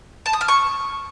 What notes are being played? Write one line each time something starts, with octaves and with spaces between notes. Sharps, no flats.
A5
D#6
F6
C#6